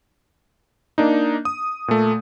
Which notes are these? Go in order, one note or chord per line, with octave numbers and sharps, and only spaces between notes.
A#3 D4 D#4
D#6
A#2 A3